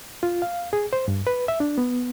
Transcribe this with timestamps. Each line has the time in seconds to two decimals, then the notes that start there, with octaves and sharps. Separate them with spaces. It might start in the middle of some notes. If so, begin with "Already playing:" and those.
0.23 F4
0.42 F5
0.73 G#4
0.93 C5
1.08 G2
1.27 B4
1.48 E5
1.60 D4
1.78 B3